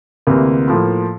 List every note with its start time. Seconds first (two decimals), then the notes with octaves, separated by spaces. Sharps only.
0.27 D2 C3 E3 A#3
0.68 A2 F3 A#3